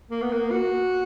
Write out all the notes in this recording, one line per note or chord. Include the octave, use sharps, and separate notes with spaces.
A#3
B3
A#3
F#4